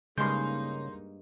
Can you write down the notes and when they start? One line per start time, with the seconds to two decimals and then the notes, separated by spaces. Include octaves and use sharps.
0.18 G2 C#3 G#3 A#3 D#4 C6 G6